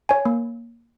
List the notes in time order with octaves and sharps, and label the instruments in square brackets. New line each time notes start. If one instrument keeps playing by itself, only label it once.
[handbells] C#5 G#5
A#3